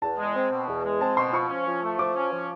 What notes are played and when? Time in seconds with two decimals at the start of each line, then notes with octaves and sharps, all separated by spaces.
0.02 E2 A5
0.18 G#3
0.35 C4
0.51 B2
0.68 E2
0.85 G#3
1.00 C4 A5
1.17 B2 C6
1.33 F3 C#6
1.49 C#4
1.67 F3
1.83 A3
1.99 F3 D6
2.15 C#4
2.31 F3